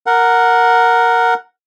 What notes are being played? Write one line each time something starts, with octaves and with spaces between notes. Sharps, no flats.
A#4 F#5